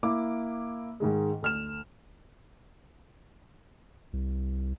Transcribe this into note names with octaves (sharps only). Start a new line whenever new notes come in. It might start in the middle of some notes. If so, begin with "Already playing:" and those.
A#3 E4 D6
G#2 D#3 G#3
D2 F6 E7
C2